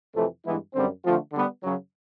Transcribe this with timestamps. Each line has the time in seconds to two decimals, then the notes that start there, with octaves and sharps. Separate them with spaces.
0.14 F2 C3 E3 A3
0.44 G2 E3 G#3 B3 E4
0.74 F#2 D3 G3 C4
1.03 D3 F3 A3 C4 F4
1.33 D3 G3 B3
1.63 F#2 C#3 F#3